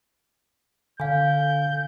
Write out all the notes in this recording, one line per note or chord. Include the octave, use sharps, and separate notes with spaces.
D3 F5 G#5 G6